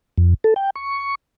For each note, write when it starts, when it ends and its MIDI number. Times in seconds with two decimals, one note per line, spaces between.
0.18 0.34 41
0.44 0.54 69
0.56 0.70 79
0.75 1.15 85